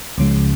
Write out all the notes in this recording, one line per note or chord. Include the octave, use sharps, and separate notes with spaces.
C#2 C#3 F3 G#3